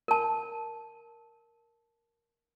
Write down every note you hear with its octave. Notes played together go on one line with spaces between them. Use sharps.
A#4 A5